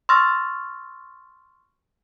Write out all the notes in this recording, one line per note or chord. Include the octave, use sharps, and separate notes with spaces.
C6 C#6 E6 F6 A6 A#6